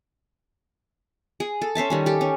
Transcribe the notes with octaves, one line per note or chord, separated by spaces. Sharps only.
G#4
A4
C#4 C5 E5 A5
D#3 G3 C#4
G4 A4
C#4